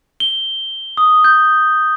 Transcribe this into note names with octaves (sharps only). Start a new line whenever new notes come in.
G7
D#6
G6